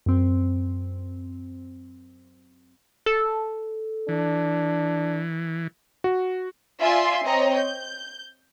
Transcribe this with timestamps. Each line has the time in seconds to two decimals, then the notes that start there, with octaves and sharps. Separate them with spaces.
0.06 F#2 C4
3.06 A4
4.08 E3 D4
6.04 F#4
6.80 F4 D5 E5 G#5 C6
7.24 C4 C#5 D#5 A#5
7.56 G6